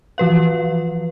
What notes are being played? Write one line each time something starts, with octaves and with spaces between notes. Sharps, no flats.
E3 F3 B4 F5